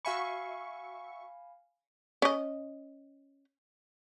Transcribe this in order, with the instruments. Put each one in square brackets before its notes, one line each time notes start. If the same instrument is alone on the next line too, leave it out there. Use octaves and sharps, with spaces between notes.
[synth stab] F#4 E5 C#6 [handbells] F5 G#5 B5
[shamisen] C#4 D#5